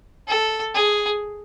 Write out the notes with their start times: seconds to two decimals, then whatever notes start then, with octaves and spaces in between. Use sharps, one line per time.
0.28 A4
0.74 G#4